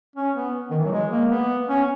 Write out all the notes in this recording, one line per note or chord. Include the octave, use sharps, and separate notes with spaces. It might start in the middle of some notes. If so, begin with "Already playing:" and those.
C#4
B3
D#3
E3
F#3
G#3
A#3
B3
C#4